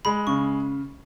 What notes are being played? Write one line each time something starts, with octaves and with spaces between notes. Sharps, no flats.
G#3 B5
C#3 C#6